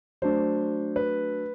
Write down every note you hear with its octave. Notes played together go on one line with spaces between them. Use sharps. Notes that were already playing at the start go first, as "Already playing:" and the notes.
F#3 A3 D4 C5
B4